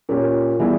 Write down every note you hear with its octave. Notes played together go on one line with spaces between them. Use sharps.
A#2 A#3 C#4 G4
E3 G3 B3 E4 G#4